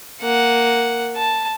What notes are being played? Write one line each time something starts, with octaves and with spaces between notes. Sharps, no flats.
A#3 F#5
A5